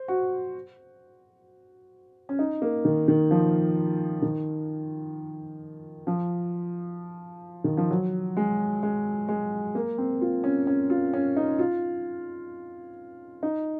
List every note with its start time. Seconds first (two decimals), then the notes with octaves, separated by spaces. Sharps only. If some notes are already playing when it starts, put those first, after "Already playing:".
Already playing: C5
0.08 F#4
2.29 C#4
2.39 D#4
2.62 A#3
2.85 D#3
3.08 D#3
3.31 F3
4.22 D#3
6.07 F3
7.64 D#3
7.77 F3
7.90 F#3
8.37 G#3
8.83 G#3
9.29 G#3
9.75 A#3
9.98 C4
10.21 F4
10.44 C#4
10.67 C#4
10.90 F4
11.13 C#4
11.36 D#4
11.59 F4
13.43 D#4